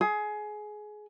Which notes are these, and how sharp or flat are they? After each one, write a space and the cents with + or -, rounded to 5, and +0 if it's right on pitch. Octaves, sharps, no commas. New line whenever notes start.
G#4 +20